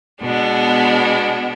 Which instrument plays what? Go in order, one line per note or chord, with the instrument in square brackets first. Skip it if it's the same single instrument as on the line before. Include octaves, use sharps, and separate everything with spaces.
[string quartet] B2 G#3 B3 D4